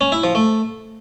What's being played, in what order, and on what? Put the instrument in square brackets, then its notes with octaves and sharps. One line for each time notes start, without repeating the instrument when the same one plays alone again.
[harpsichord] C#4
E4
F3
A3